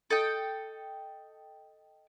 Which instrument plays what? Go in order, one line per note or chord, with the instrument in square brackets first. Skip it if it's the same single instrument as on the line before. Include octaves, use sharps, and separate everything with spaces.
[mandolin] A4 D#5 G5